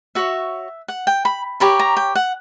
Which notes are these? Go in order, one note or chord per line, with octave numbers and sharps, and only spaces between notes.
F#4 C#5 E5
F#5
G5
B5
G4 A#4 C#5 B5
A#5
G5
F#5